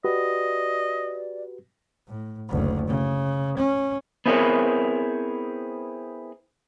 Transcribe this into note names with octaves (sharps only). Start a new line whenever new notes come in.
F#4 G4 B4 D5 D#5
A2
F#1 D2
C#3
C#4
B3 C4 E4 G#4 A#4 C#5